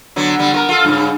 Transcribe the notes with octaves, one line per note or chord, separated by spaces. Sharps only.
D3 F#3 B3
D3 G3 B3
B3 F4 A#4
F4 A4
G2 C#3